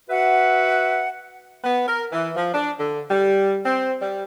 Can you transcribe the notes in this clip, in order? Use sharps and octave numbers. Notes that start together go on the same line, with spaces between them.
F#4 B4 E5 F#5
B3
A#4
E3
F3
D4
D3
G3
C4
G3